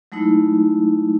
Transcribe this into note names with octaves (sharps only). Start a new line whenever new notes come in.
F#3 G#3 A3 D#4 E4